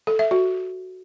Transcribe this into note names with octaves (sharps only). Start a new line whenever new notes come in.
A4
E5
F#4